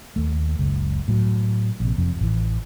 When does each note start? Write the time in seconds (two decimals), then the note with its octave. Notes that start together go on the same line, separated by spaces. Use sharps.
0.16 D#2 A3
0.59 F#1 C#2
1.08 A2 F#3
1.80 A#1 C3
1.96 F1 F2
2.19 A1 E3